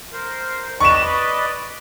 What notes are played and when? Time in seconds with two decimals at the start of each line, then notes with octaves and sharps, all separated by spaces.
0.13 A#4 C5
0.80 B4 D5 D#5 C#6 E7